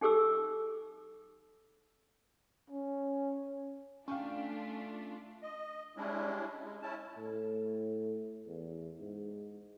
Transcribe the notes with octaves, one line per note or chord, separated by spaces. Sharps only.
D#4 G4 A4 D6 E6
C#4
A3 C#4 D4 F4 F5 G5 C#6
D#5
G3 G#3 C#4 D4 E4
G#3
C#4 E4 A5
A2
E2
G#2